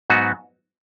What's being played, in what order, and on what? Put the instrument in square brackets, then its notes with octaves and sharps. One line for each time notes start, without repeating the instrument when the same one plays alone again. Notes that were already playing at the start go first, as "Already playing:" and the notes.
[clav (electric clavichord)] G#2 F#3 B3 D#4 F#4